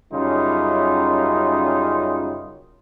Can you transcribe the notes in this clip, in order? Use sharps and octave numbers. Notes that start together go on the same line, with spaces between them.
F#2 C#3 G3 D#4 F4